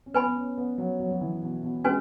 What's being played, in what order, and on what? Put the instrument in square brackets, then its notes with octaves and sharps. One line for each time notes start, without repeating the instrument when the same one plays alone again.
[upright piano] C#4
[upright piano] B3 [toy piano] B4 G#5 B5
[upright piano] B3
C#4
B3
F#3
F#3
F#3
E3
B2
B2
[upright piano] G#3 [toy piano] C#4 F#4 B4 G#5